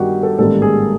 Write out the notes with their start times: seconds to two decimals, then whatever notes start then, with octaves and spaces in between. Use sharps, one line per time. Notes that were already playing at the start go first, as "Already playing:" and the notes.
Already playing: G1 G2 D#3 F#4 G4
0.23 A4
0.38 A1 G#2 D#3 G3 A#3 A4
0.62 G#4